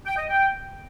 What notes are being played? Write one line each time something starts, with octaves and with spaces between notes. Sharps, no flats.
G5
D#5
G5